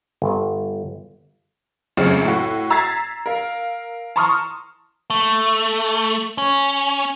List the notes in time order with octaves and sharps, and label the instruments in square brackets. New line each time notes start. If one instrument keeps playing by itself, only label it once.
[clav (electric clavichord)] G1
[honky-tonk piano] F1 C#2 F#2 C#3 C4 G#4
A2 F#4
A#5 E6 G#6 A6 B6 C7
A#4 F5
A5 A#5 C6 C#6 D#6 F6
[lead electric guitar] A3
C#4